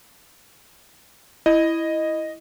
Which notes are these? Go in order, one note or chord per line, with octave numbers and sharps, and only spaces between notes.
E4 D#5